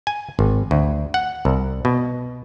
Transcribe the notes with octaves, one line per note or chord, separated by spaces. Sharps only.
G#5
G#1
D2
F#5
C2
B2